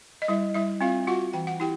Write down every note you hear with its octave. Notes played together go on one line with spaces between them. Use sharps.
D#5
G3 E4 E5
G3 E4 E5
C4 F4 F5
F4 F#4 F#5
E3 G5
F#5
E4 G4 G5